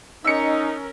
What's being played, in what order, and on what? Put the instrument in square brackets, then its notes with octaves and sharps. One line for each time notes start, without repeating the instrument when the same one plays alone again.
[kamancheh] C#4 A#4 [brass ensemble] D#4 [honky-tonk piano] E6 C#7